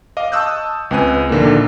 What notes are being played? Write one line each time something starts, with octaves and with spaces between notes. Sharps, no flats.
D#5 F5 D6
A5 C#6 D#6 E6 F#6 G6
C#2 C4 B4 G#5 F#6 D#7
A#1 D3 D#3 A#3